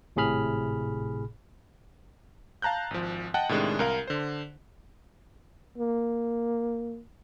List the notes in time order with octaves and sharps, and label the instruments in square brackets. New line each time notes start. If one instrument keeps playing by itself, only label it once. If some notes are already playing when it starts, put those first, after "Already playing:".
[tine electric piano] G#1 A2 C3 G#4 B5 F6
[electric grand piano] F5 A5 A#5 F#6 G6
G#1 F3
D#5 F#5 G5 A5 F#6
A2 C3 D#3 G#3 D4
C2 A#4 F5
D3 C5
[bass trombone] A#3